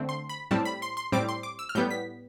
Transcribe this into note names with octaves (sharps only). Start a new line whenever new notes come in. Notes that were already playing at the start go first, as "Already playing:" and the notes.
Already playing: D3 A3 C4
C6
B5
A2 G3 C4 A5
B5
C6
C6
A2 G3 C4 D6
C6
D6
E6
F6
A2 G3 B3 G6
B6